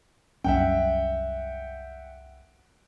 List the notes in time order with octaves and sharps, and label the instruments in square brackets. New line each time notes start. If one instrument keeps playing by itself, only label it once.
[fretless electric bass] C2 F#2 C#4 [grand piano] E5 F#5 G5